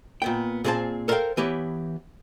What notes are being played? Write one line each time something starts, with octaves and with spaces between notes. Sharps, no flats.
A#2 B3 G5
A#2 C4 G#4 C5 D5 A5
A4 A#4 C5 D#5 F5 G5
E3 B3 G4 B4 C#5